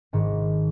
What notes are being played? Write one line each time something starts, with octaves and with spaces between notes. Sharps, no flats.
G#1 G#2 D#3